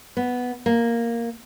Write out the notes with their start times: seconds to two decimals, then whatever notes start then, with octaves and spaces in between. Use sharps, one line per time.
0.17 B3
0.66 A#3